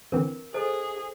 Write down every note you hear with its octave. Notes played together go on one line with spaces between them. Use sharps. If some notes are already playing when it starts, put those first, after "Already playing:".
D3 E3 C4 A#4
G#4 A4 C5 D#5